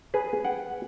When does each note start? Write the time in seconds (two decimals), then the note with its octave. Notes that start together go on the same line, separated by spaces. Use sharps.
0.14 G#4 B4
0.45 F#5 G5